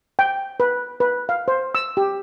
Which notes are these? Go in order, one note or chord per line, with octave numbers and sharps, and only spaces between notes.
G5
B4
B4
F5
C5
E6
G4